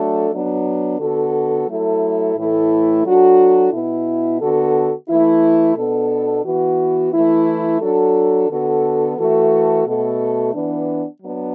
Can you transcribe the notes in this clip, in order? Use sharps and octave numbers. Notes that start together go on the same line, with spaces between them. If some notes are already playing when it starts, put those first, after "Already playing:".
Already playing: F#3 A3 D4 F#4 A4
F#3 B3 D4
D3 B3 F#4 A4
F#3 A3 E4 A4
A2 E3 A3 E4 A4
F#3 D4 F#4 A4
B2 B3 E4
D3 B3 F#4 A4
E3 A3 E4
B2 B3 D4 A4
E3 B3 F#4
E3 A3 E4
F#3 D4 F#4 A4
D3 B3 F#4 A4
E3 A3 F#4 A4
B2 A3 F#4 A4
E3 B3 D4
F#3 B3 D4